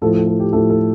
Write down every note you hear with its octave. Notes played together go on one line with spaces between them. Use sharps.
A2 F3 A3 A4
A4
A4
G4
A2 F3 A3 A4
A4